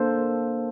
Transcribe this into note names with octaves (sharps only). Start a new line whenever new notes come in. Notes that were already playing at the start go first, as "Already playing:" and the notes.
Already playing: A#3 D4 A4 C5